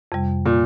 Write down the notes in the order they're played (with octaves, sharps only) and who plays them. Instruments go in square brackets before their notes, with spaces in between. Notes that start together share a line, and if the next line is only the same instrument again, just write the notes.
[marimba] F2 C3 G3
[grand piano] A#2